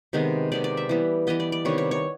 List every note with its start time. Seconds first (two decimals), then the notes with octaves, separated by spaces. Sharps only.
0.13 C3 D#3 G#3 B3
0.52 C3 D#3 G#3 B3 D5
0.64 D5
0.77 E5
0.89 E3 G3 B3
1.27 E3 G3 B3 D#5
1.40 D5
1.52 D5
1.65 C3 D#3 G3 B3 C#5
1.78 C#5
1.91 C#5